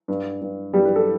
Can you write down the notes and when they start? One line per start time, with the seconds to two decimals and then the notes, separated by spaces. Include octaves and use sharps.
0.08 G2
0.41 G2
0.73 G2 G3 G4
0.85 B4
0.96 A4